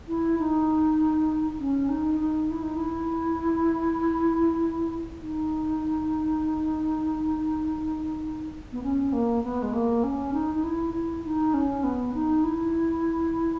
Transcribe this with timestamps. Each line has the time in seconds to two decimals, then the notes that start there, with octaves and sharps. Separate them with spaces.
0.08 E4
0.39 D#4
1.59 C#4
1.89 D#4
2.20 D#4
2.50 E4
2.63 D#4
2.77 E4
5.22 D#4
8.72 B3
8.83 C#4
9.13 A#3
9.44 B3
9.63 G#3
9.74 A#3
10.04 C#4
10.33 D#4
10.55 D#4
10.64 E4
10.94 E4
11.25 D#4
11.54 C#4
11.84 B3
12.14 D#4
12.44 E4